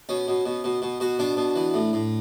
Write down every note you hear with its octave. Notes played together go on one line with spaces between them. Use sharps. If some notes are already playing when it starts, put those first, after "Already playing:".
B2 C#4
B2
B2
B2
B2
B2 F#4
B2 D4
B2
E3
A2
A2